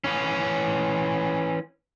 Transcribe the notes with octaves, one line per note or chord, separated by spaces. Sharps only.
E3 C#4